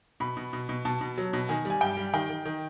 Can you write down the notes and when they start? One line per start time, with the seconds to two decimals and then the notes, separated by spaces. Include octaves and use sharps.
0.20 B2 B5
0.37 B2
0.53 B2
0.69 B2
0.85 B2 A5
1.01 B2
1.18 F#3
1.33 B2
1.49 D#3 G#5
1.65 G3 G#5
1.81 G2 G5
1.97 G3
2.13 D#3 G5
2.30 D#3
2.46 D#3